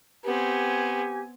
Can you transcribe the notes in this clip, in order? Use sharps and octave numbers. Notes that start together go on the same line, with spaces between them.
B3 C4 G4 G#5